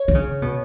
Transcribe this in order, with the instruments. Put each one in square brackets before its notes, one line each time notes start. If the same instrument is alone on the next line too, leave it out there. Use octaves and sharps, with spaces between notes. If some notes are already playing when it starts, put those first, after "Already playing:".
Already playing: [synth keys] C#5
[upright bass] D#3
C#3
B2